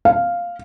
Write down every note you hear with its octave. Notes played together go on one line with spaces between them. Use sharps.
F5